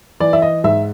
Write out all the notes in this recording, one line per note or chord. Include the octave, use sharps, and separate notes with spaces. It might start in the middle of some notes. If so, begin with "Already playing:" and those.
E3 D5
E5
D#5
G#2 E5